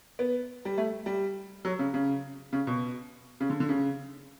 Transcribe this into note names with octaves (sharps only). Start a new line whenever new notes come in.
B3
G3
A3
G3
F#3
C#3
C#3
C#3
B2
C#3
D3
D3
C#3